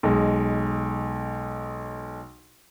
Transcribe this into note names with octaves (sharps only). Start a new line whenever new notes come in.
B1 G#3